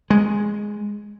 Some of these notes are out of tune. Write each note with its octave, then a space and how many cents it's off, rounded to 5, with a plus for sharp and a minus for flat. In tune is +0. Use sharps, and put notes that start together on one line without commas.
G#3 -5